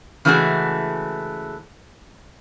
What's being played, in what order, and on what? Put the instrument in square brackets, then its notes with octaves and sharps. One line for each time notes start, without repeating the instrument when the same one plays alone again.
[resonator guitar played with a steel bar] C#3 E3 G#3 A3 F#4 G#4